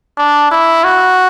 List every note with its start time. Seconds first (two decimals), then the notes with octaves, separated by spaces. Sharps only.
0.17 D4
0.51 E4
0.84 F#4